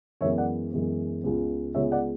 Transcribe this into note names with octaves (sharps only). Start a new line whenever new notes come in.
F#2 E3 G#3 B3 C#5 E5
D5 F#5
F#2 E3 G#3 B3
C#2 C#3 G#3 B3
C#2 C#3 G#3 B3 C#5 E5
D5 F#5